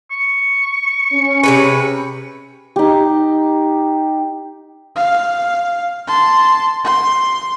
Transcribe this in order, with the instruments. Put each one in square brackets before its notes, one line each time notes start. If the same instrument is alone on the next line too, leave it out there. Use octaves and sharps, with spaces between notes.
[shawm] C#6
[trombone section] C#4
[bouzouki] C3 G#4 B4
[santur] D#4 G4
[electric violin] F5
A5 C6
C6